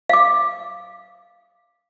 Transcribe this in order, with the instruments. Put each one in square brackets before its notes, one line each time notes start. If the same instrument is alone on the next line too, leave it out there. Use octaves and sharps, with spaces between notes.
[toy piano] F5 D6